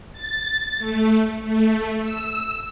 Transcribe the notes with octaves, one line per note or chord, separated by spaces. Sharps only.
A6
A3
A3
E6